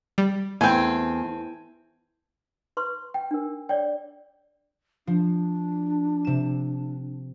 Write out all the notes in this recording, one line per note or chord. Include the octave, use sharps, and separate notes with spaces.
G3
E2 A3 C4 G5 G#5
B4 C6 C#6
G5
D4 A#4
C#5 D5 G5
F3 D4
C3 E7